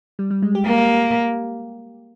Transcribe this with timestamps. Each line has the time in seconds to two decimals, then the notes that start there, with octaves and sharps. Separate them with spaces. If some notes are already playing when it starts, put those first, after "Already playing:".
0.19 G3
0.31 G3
0.42 G#3
0.55 G4
0.66 A#3 G4